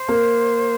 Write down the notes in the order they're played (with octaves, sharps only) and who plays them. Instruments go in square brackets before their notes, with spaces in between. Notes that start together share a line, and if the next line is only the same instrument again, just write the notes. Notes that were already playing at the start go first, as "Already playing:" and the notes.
Already playing: [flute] C5
[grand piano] A#3